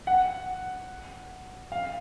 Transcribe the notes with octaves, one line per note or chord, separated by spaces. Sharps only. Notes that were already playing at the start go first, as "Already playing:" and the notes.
F#5
F5